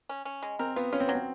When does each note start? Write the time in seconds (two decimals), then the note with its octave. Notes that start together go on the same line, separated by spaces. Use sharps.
0.09 C#4
0.25 C#4
0.43 G#3
0.59 C4 A#4
0.76 B3 F4
0.92 C#4 F4
1.00 C4
1.07 F#3 B3
1.15 C4